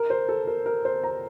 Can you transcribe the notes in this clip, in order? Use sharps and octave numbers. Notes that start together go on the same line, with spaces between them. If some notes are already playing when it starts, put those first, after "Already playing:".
Already playing: A#4
C5
A4
A#4
A#4
C5
A#5